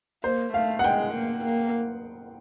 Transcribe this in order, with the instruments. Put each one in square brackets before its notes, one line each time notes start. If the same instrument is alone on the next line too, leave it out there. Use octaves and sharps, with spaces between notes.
[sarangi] A#3 [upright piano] C5
[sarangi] A3 [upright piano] F5
[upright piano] F#5
[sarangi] G#3 [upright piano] G5
[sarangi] A#3
A#3